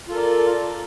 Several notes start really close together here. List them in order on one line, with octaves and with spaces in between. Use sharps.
F4 A4 A#4 D5